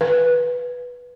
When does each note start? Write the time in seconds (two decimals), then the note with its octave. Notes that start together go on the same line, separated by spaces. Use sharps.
0.01 B4